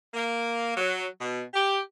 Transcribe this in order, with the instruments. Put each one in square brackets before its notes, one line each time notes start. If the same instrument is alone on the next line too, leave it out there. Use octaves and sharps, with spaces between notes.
[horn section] A#3
F#3
B2
G4